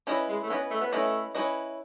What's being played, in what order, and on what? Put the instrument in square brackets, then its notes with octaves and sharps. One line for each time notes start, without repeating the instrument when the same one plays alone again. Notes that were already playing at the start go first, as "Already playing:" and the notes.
[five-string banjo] C#4 E4 B4 D#5
[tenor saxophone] G#3
A3
[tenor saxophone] B3 [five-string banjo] C#4 E4 B4 D#5
[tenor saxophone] A3
B3
[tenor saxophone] A3 [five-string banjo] C#4 E4 B4 D#5
[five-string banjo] C#4 E4 B4 D#5